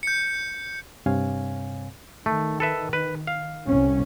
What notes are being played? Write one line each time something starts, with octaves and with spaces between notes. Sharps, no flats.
G6 C#7
G2 C3 C4 C#5 F5 G#5
D#3 A3
A4 B4 E5
B4
F5
C2 C#4